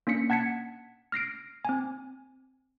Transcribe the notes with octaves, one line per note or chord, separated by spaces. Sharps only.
A#3 C#4 D4 B6 C#7
F#5 A5 G#6 B6 C#7
F6 A#6 C7 D7
C4 G#5